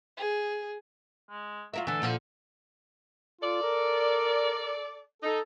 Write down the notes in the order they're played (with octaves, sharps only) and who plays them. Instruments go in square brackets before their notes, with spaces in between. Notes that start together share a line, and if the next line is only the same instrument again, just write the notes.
[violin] G#4
[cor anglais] G#3
[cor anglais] F#3 [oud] F4 A#4 E5
[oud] D3 E3 [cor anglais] A4
[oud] A#2 D3 F3
[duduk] F4 [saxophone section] A4 D5
[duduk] A#4
[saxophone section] D#4 [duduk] A4